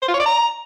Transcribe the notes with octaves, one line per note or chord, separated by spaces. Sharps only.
C5
F4
C#5
D5
A#5